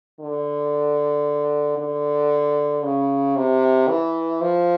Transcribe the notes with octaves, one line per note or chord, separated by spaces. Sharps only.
D3
D3
C#3
C3
E3
F3